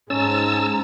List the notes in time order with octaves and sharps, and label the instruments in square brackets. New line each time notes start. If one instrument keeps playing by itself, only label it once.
[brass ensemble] G#2 [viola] G#3 A#5 [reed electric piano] C#4 [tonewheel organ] A5 E6